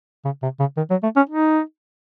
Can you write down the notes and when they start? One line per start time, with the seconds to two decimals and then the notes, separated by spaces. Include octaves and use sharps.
0.25 C#3
0.43 C3
0.60 C#3
0.77 D#3
0.91 F#3
1.03 A3
1.17 C#4
1.29 D#4